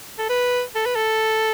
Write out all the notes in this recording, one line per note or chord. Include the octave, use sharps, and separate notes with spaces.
A4
B4
A4
B4
A4